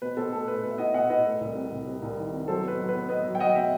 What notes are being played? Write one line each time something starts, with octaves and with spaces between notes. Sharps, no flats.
B2 B4
B2 A4 C5
A3 A4
A3 B4
B2 B4
E5
E4 D#5 F#5
B2 D#5 F#5
E4 B4 D#5
A3
C2
C3
C2
C3
C2
D#3
C3
F#3 A4 C5
B3 B4
F#3
B3 B4
B3 B4 D#5
F#3
G5
F#3 D#5 F#5
B2 E5 G5